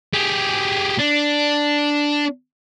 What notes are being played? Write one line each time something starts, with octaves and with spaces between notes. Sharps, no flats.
G4 G#4
D4